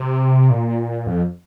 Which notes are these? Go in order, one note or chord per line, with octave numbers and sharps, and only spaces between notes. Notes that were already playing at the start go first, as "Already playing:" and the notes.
Already playing: C3
A#2
F2